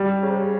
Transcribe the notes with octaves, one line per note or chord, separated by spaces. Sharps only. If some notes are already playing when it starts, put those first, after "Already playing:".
Already playing: G3
C#3
C3
C#3